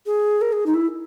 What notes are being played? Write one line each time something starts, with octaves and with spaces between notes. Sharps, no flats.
G#4
A#4
G#4
D#4
E4